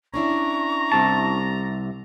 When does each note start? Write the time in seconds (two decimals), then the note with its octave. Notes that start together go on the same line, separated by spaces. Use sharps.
0.14 C#4 D4 E4 A#5 C#6
0.92 C2 C3 A5